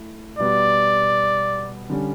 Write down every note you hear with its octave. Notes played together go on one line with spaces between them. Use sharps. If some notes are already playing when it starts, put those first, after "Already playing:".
Already playing: A3 E4
B2 G3 B3 F#4 D5
D3 G3 C#4